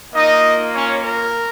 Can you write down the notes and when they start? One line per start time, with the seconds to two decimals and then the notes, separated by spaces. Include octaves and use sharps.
0.14 A#3 D#4 F4 D#5
0.74 C#4 C#5
1.03 A#4